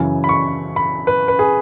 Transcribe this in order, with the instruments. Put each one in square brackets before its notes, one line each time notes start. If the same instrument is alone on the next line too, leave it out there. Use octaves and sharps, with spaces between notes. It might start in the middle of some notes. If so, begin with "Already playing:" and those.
Already playing: [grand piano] F#2 C#3 E3 G#5
B5
C#6
B5
B4
B4
G#4